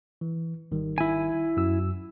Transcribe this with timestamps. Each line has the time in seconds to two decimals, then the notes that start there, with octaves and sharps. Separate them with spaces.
0.21 E3
0.71 G#1 D#3 G3
0.98 E4 G#5
1.57 F#2 F#4 E6